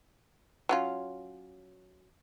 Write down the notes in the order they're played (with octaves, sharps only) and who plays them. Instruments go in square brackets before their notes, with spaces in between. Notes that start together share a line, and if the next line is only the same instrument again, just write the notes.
[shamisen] F#3 C#4 F4